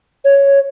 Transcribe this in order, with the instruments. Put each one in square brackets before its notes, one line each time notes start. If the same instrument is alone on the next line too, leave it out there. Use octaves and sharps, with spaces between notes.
[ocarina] C#5